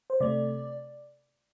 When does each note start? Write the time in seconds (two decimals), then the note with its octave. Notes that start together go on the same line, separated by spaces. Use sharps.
0.10 C5
0.20 C3 A3 D5